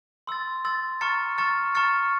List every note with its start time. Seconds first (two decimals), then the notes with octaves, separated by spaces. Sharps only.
0.27 C6 E6 A6
0.65 C6 E6 A6
1.01 A#5 C#6 F6 A6 C#7
1.38 A#5 C#6 F6 A6 C#7
1.75 A#5 C#6 F6 A6 C#7